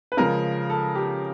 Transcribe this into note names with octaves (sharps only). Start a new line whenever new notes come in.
B4
C#3 F3 G#3 A#4
A4
G4